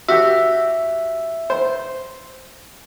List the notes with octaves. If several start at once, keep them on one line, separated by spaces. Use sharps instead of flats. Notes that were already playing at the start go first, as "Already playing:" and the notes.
F#4 G4 E5 E6
C5